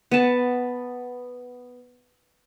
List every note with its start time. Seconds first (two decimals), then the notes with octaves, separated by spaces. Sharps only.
0.11 B3 A5